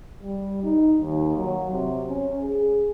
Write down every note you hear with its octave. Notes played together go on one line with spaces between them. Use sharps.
G3
D#4
D#2
F#3
C3
C#4
G#4